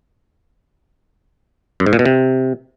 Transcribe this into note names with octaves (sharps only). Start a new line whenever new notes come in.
F#2
G#2
A#2
B2
C3